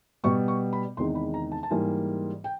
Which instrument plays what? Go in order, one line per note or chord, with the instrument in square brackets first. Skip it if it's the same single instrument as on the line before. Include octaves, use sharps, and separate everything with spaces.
[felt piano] B2 G3 B3 C#6
C#6
B5
E2 C3 D#3 G#3 C6
B5
A#5
A5
A5
G#2 E3 G3 A#3 G#5
G5